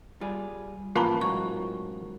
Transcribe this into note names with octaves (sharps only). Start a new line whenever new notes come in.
G3 F4 G#4
A1 A#2 F3 A#3 F4 B4 A5 A#5
G#2 F#3 C#6